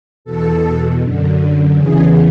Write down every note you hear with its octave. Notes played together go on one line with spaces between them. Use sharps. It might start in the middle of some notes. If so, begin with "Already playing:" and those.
E2 B2 A4
F#2 D3
E2 C#3 E3 G#4